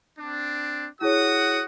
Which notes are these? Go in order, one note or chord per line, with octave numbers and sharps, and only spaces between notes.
C4 D4
E4 F#4 G#4 C#5 F#5 D#6